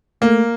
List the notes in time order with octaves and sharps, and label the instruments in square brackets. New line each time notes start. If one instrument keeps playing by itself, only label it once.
[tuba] A3 [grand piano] A#3